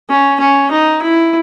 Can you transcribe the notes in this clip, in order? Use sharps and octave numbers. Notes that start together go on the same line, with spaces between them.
C#4
C#4
D#4
E4